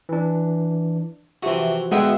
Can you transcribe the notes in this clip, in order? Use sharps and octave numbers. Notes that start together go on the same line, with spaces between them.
E3 D4
C3 E3 F3 F#4
D2 B2 G#3 B3 D#5 E5 F#5 G5